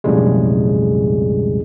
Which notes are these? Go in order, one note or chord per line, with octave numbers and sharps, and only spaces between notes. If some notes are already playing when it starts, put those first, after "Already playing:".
B1 F2 A2 C#3 G3 G#3